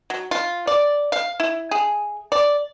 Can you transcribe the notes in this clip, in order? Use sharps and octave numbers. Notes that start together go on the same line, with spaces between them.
F#3
F4
D5
F5
E4
G#4
D5